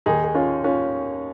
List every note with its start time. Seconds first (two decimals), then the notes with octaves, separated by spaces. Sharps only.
0.06 D#2 D#3 D#4 G#4
0.24 G#4
0.35 C#4 F4
0.64 C#4 F4